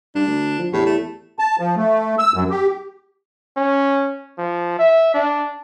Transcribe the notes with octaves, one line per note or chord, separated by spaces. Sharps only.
G2 D4
D2
F3
E2 A2 G4
A3
A5
F3
A3
E6
F#2
G4
C#4
F3
E5
D4